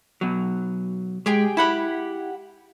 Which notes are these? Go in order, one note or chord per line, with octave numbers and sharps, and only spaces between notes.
B2 F#3
G#3 G4 G#4 G5
E4 G4 F#5 B5